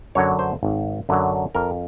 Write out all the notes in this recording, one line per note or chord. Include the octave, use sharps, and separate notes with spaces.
F#2 D3 F#3 C#5
C5
G#1
F#2 D3 F#3
F2 A#4